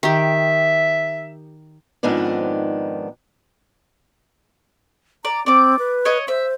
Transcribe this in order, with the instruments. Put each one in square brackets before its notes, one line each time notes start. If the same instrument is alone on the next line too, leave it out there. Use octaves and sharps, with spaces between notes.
[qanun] D#3 G4 [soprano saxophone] E5
[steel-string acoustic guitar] F2 G#2 D#3 B3 D4
[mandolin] D5 [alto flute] A#5
[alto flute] C4 [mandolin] D5 D6
[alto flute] B4
[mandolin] C#5 D#5
[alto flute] C5 [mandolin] E5